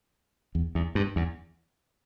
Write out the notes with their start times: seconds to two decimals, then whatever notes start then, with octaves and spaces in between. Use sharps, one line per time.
0.55 E2
0.75 E2
0.95 G2
1.16 E2